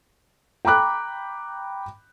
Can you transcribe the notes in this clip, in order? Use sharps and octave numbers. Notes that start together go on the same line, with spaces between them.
G5 A#5 B5 D6 F#6